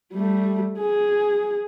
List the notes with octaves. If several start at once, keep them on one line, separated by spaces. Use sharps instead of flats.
G3 A3
G#4